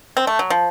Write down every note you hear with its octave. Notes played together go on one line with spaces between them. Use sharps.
C4
A3
F#3
F3